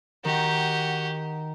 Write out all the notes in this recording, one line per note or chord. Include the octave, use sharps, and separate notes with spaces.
D#3 F#4 G4